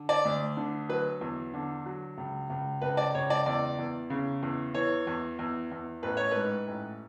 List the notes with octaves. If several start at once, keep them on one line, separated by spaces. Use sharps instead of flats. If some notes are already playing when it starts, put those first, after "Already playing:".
Already playing: D3
D5
D2
D3
F#3 B4
E2
D3
F#3
C#2
C#2
C#2 B4
D5
C#2 C#5
D5
E2 D5
E2
C#3
E2
E3 C#5
E2
E2
E2
A1 B4
C#5
G#2 B4
A1